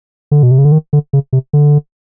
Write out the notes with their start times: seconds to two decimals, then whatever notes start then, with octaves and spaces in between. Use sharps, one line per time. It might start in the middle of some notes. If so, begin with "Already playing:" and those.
0.31 D3
0.43 B2
0.51 C3
0.58 C#3
0.65 D3
0.72 D#3
0.93 D3
1.13 C#3
1.33 C3
1.53 D3